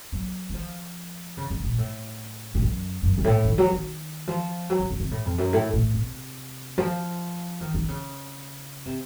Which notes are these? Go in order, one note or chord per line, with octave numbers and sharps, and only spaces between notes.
F#3
F#3
F3
C#3
C#3
A#2
A2
A2
F#2
F#2
F#2
A2
D#3
F#3
D#3
F3
F#3
C#3
C#3
C3
A2
F2
F#2
A2
A2
C3
F3
D#3
D#3
C#3
C3